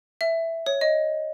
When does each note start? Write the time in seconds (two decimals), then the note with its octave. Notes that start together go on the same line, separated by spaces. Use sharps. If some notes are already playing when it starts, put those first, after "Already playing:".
0.21 E5
0.66 C#5
0.81 D#5